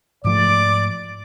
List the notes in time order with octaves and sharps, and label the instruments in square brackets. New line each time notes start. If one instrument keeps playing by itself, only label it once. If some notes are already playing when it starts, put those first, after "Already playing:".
[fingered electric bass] G#2 F3 A3 [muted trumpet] D5 [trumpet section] D6